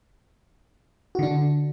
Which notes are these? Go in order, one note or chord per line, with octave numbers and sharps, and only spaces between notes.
D3 D4 F#4